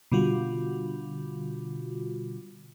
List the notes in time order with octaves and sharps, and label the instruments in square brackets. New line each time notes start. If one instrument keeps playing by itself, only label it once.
[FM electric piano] B2 D3 G3 F4 F#4